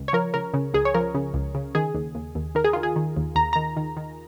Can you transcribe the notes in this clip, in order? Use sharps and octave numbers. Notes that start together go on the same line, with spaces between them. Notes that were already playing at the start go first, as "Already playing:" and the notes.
Already playing: C#2
C#5
F3 A#4
C#2 A#4
C#3
C#2 G#4
C#5
F3 A#4
C#3
C#2
C#3
D#3 G#4
D#2
D#2
D#2
D#3 A#4
G#4
D#3 F4
G#4
D#3
D#2
D#2 A#5
D#3 A#5
D#3
D#3